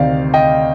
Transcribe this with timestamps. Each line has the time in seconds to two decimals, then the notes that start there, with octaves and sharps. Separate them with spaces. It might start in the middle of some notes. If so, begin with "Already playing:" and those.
Already playing: D2 C3 D#3 D5 F5
0.34 D#5 G5